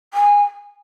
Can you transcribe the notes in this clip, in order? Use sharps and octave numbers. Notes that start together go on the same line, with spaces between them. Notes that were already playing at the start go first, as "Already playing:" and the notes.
G#5